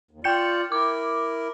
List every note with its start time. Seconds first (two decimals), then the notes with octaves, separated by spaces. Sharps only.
0.11 D#2
0.24 F4 D5 G5 G6 C#7
0.72 E4 A#4 D6